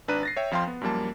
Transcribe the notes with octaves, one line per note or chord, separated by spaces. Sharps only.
G#1 D4 B4 A#5 F#6 D#7
A6 A#6 C7
C#5 E5 G5
F2 F3 F5 G5 C6
B3
F#2 F3 G3 A#3 A5